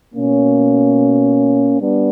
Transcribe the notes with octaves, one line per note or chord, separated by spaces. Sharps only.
B2 A#3 C#4
G3 B3 D4